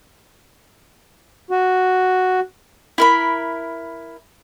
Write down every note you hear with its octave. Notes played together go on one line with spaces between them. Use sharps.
F#4
E4 A#4 B5